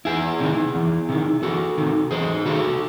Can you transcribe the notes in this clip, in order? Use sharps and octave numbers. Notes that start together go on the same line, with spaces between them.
E2 E4 G#4
C3 D#3
E2
C3 D#3
E2 F#4 A4
C3 D#3
E2 G#4 C5
C3 D#3 F#4 A4